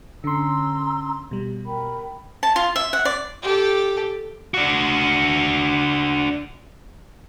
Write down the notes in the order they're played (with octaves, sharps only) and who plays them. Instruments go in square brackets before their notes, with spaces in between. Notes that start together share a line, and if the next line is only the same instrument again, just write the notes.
[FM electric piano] D3 C6 [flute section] C#4 A#5 E6
[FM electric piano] B2 G3
[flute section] A#4 G5 B5
[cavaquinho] A5
F4
E5
F#5
D5
[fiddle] G4 A4
[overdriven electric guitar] D4 F#4